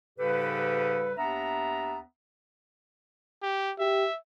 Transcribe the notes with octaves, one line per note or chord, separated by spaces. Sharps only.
G#2 C#3 G3 G4 A4 B4
D#2 B3 D4 E5 A#5
G4
G4 E5